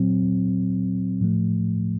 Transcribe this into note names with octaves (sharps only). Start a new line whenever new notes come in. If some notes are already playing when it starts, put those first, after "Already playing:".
Already playing: A#2 F#3 C4
A2 F3 A3